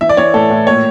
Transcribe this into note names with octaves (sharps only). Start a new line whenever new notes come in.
E3 E5
D5
E3 C#5
A2 A4
A2
A#2 C#5